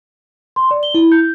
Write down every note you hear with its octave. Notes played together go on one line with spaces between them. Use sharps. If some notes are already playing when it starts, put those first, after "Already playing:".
C6
D5
G7
E4
G6